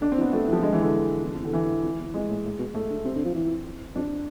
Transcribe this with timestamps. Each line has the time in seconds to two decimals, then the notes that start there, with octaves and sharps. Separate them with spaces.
0.01 D3 D4
0.12 C4
0.17 E3
0.21 B3
0.32 F3 A3
0.48 E3
0.53 F3
0.63 D3 G#3
0.73 E3
0.82 D3
1.24 E2
1.33 F2
1.42 E2 D3
1.53 E3
1.83 F2
1.99 E2
2.14 F2 G#3
2.30 A2
2.45 A2
2.59 B2
2.74 A2 A3
2.90 D3
3.04 C3 C4
3.16 D3
3.25 F3
3.35 E3
3.95 F2 D4